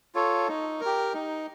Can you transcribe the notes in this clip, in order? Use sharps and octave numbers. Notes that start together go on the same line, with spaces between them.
F4 A4 C#5
D#4
A#4
G4
D#4